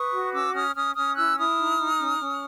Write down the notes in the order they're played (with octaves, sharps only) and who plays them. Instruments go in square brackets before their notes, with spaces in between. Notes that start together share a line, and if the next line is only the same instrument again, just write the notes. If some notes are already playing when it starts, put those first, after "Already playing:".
Already playing: [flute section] B4 C#6 D#6
F#4
C#4 D6 E6
C#4 D#6 F6
C#4 D#6 F6
C#4 D#6 F6
E4 E6 F#6
E4 D#6 F6
D#4
D#4
C#4
C#4